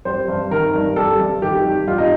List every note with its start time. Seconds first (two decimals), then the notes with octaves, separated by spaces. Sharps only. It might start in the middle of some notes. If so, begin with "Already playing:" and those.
0.05 G3 C5
0.28 G2
0.51 D#3 A#4
0.74 G2
0.96 G3 A4
1.20 G2
1.42 D#3 G4
1.65 G2
1.87 G3 F4
1.98 D#4